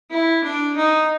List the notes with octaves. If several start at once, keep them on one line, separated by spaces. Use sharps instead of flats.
E4
D4
D#4